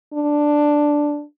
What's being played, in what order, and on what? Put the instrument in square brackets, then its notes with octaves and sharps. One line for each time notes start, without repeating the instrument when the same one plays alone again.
[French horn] D4